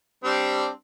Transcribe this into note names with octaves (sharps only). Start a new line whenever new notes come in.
G3 C4 D4